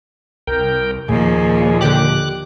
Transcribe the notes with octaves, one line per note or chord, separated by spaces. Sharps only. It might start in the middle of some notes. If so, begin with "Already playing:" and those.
C2 A#4 G5
D#2 A#2 F3 G#4
D3 G4 D6 F#6